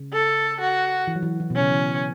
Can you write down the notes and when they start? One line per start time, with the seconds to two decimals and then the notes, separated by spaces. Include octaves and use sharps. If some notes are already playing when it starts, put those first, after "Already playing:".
Already playing: C#3
0.13 A4
0.61 F#4
1.07 E3
1.16 F#3
1.23 E3
1.40 E3
1.50 B2
1.55 C#4
1.61 C#3
1.72 E3